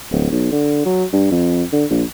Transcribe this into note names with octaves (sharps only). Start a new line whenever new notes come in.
D1
B1
D3
F#3
G2
F2
D3
A#1